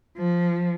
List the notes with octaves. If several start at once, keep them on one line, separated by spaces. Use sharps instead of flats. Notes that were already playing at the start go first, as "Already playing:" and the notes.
F3